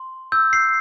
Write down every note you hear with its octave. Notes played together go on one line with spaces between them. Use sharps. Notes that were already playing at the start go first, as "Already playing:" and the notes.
Already playing: C6
E6 G6
C7